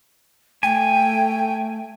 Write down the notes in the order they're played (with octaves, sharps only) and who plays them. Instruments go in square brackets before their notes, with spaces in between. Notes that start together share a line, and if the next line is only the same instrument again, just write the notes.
[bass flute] A3 [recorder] G5 [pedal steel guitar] G#5